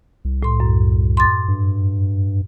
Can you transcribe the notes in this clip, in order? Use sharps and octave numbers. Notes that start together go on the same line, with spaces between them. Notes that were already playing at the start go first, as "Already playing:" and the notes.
C2
A2 C6
F#2
C6 D6 A6
G2